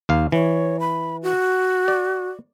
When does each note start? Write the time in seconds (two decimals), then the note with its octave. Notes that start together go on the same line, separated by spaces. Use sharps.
0.09 D#2 F5
0.32 E3 C#5
0.80 B5
1.23 F#4
1.88 D5